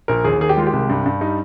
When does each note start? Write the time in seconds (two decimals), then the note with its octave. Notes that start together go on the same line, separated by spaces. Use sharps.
0.08 A#1 A#4
0.24 D#2 G#4
0.40 D#3 G#4
0.49 G4
0.57 G#3 F4
0.67 G4
0.73 C2
0.89 G2
1.06 G2
1.21 G3 D#4